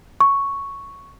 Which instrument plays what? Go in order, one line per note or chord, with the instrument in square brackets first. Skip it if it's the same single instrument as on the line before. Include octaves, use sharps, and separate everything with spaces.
[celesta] C#6